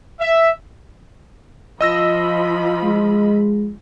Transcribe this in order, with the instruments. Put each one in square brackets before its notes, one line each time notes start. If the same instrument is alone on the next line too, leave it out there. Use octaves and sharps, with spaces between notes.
[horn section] E5
[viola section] F3 F4 B5 [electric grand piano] D#5 E6 A#6
[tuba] G#3